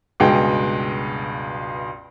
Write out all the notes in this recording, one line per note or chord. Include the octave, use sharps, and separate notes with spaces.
C#2 G2 B2 G#3 G5